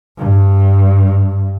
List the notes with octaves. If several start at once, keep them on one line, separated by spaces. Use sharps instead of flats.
G2